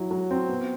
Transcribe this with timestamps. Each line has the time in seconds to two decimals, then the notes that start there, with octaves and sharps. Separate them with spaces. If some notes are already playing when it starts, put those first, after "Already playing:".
Already playing: F#3 E4
0.11 F#3
0.31 C4
0.49 B3